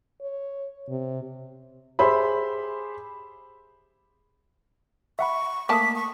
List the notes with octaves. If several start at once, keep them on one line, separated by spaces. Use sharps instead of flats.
C#5
C3
G4 G#4 C5 E5 B5
E5 F#5 B5 C#6
A3 A#3 A5 D6 D#6 B6
C#6